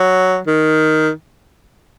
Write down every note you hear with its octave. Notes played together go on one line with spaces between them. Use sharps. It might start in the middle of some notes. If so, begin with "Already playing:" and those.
Already playing: F#3
D#3